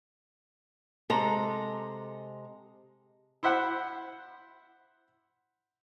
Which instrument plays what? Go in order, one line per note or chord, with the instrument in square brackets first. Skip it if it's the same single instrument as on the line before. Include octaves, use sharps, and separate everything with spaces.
[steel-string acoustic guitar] C3 G#3 A#5 [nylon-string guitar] A4
[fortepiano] E4 C5 E5 F#5